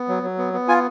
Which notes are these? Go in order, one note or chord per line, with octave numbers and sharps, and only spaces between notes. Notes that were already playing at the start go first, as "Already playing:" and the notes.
Already playing: B3
F#3
F#3
B3
B3
F4 G#5